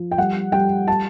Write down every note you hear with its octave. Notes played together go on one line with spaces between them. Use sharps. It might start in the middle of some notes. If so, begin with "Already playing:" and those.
Already playing: F3
G5
G3 F#5
G3 G5
A5